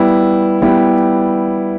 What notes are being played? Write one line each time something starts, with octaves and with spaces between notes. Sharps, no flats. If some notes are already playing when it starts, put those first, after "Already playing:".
Already playing: G3 B3 E4 G4
G3 B3 E4 G4